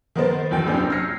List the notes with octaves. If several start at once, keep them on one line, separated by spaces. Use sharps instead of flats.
D#3 B3 A#4 C5 A6
E2 F#3 G5
F1 A#1 F#3 C#4 D4 G6
E6 F6 G#6 A#6 C7 C#7